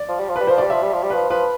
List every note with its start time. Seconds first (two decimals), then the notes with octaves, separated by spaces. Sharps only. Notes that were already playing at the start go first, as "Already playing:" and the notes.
Already playing: D5
0.09 F3
0.19 G3
0.30 F3
0.36 B4
0.41 G3
0.47 F3 C5
0.58 G3 D5
0.70 F3 E5
0.83 G3
0.93 F3
1.03 G3
1.10 F3 B4
1.30 F3 B4